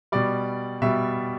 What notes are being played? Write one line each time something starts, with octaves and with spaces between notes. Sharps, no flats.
B2 G3 D5
B2 G3 E5